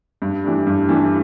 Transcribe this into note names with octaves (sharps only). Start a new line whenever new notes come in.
G2
E3 A3 D4 G4
G2
E3 A3 D4 G4